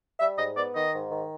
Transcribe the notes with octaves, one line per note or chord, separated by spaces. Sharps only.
G3 E5
G#2 D#5
B3 D5
D#3 D#5
G#2
D#3